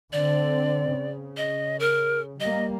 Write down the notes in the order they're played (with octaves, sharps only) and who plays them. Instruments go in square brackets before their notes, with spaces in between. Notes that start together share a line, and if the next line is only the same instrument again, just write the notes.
[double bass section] D3 C4 [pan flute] D5
[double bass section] C#3
[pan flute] D#5
A#4
[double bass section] G3 A#3 [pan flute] D#5